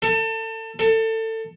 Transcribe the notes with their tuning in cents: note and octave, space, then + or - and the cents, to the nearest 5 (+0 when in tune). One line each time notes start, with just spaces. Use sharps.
A4 +30
A4 +25